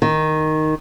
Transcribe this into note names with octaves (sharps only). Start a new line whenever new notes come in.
D#3